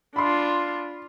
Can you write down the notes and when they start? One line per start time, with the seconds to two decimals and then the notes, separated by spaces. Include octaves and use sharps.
0.16 D4 F4 B5 C6